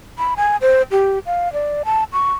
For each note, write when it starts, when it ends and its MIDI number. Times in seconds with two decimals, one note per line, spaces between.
0.18 0.34 83
0.37 0.57 80
0.61 0.82 72
0.91 1.19 67
1.26 1.52 77
1.53 1.83 74
1.85 2.04 81
2.13 2.34 85